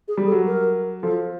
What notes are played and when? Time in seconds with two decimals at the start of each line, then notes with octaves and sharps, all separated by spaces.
0.08 G#4
0.17 G3
0.26 A4
0.32 F#3
0.47 A#4
1.03 F3 A4